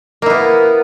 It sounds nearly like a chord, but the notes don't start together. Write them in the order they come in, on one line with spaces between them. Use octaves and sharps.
A#3 E4 B3